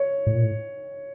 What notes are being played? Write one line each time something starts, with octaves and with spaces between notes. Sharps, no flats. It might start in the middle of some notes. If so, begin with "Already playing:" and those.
Already playing: C#5
A2
A#2
A2